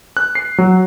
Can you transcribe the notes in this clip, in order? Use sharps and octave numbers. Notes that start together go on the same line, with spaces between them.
F#6
C7
F#3